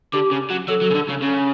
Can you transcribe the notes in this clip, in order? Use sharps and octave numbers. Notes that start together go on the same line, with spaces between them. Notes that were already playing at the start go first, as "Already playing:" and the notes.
D3 G4
C#3
F#3
F#3 A4
F#3
C#3
D3
C#3
C#3